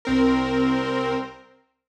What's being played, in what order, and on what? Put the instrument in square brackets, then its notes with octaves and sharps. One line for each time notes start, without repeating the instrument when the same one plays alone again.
[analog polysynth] C2 C4 A#4